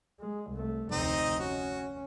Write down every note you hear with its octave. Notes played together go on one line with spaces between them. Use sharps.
G#3
C2 A3
F1 D2 C4 D#4 D#5
C#4 F#4